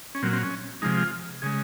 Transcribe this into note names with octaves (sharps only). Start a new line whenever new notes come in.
C#4
A#2 F#3 C4
C4
C#4
C3 F3 G#3 D#4
F4
C#3 G#3 G#4